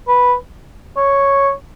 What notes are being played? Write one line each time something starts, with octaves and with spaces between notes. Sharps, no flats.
B4
C#5